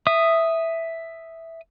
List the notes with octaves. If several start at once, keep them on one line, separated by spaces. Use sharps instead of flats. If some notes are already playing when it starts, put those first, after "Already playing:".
E5 D#6